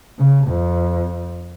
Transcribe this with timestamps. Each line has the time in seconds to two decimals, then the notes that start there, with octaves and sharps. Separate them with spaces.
0.18 C#3
0.47 F2